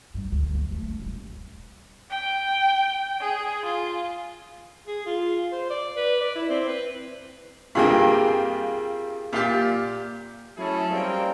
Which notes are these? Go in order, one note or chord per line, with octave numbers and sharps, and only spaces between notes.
G2 G3
D2
A#3
A3
F#1
D#1
G5
G#4
F4
G#4
F4
C5
D5
B4
D5
E4
C4
B4
G2 C3 A#3 F4 G#4 G5
A#2 F4 G4
F#3 A3 C#4 E4 G#4 A4
G3 A#3 C4 C#4 A#4 G5